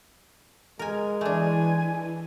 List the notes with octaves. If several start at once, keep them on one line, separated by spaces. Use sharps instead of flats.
G#3 A#4 G#5
E3 A3 D4 G#5